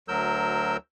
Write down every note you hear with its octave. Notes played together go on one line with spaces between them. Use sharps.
D2 F#3 A#4 E6 G6